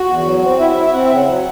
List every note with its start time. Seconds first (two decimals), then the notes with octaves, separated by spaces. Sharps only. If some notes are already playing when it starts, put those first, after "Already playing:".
Already playing: F#4
0.08 E2
0.25 F#3
0.42 C4
0.59 E4 E5
0.71 E5
0.76 E4
0.83 E5
0.93 C4 F#5
1.05 E5
1.11 C#3
1.16 F#5
1.28 F#3